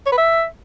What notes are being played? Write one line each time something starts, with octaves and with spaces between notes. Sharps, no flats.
C#5
B4
E5